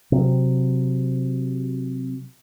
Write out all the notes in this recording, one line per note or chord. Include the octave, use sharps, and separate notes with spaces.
C3 F#3 C4